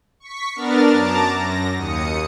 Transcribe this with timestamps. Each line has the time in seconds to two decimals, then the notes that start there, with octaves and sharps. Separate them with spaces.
0.20 C#6 B6
0.55 B3 D4 A#4 F6 A6
0.91 F#2 A5 A#5 D6 A6
1.35 F#2 A#6
1.77 D#2 D#6 C#7